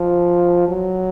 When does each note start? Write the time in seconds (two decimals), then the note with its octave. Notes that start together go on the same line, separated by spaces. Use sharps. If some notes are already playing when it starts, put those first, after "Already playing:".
Already playing: F3
0.68 F#3